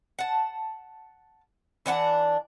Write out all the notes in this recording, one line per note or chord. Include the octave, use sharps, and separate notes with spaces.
F#5 A5
E3 D4 F#5 A5